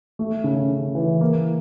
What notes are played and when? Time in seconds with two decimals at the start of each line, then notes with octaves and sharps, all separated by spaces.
0.19 A3
0.44 C#3
0.70 C#3
0.95 E3
1.21 A#3